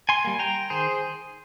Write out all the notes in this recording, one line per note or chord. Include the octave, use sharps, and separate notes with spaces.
G#5 C6
G3 A#3
G5 A#5
D#3 G#4 C5